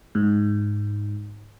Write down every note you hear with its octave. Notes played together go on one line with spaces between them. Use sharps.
G#2